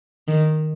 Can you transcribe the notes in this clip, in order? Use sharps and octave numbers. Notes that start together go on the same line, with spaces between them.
D#3